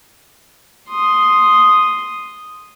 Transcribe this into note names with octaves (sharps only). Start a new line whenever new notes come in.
C6 D#6